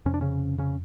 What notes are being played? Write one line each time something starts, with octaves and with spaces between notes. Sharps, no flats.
F2 C3 C#4
D4
C#3 C#4
C#3 C#4